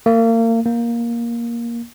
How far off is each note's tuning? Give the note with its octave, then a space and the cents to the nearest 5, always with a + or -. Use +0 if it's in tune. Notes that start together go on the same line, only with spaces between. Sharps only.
A#3 -35
A#3 +10